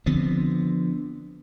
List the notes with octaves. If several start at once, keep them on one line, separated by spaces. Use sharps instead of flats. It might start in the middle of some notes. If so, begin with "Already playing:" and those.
D3 F3 B3 C4